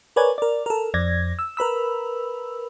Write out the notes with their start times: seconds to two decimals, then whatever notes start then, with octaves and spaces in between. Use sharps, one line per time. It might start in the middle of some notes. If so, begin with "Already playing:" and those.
0.16 A#4 B4 C#5 D5 G#5
0.38 A#4 D5
0.66 A4 A#4
0.94 F2 D5 G#6 A#6
1.39 E6
1.57 A#4 B4 B5 E6